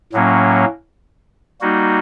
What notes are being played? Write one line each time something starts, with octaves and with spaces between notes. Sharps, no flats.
A2 F#3 A#3 C#4
G3 A#3 D#4 F#4